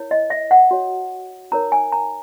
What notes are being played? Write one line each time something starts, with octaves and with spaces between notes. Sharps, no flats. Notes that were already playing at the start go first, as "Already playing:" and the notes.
Already playing: E4 A#4 C#5
D#5
E5
F#5
F#4 C#5
D#4 A#4 C#5 A#5
G#5
A#5